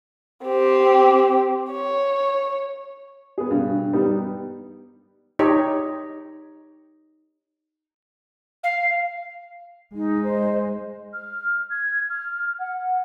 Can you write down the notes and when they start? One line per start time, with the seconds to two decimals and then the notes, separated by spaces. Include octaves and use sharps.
0.45 C4 G4
1.72 C#5
3.38 B3 G#4
3.51 G2 B2
3.93 G3 B3 D#4
5.39 D#4 G4 C#5
8.63 F5
9.95 G#3 D#4
10.24 C5 D#5
11.13 F6
11.71 G#6
12.10 F6
12.59 F#5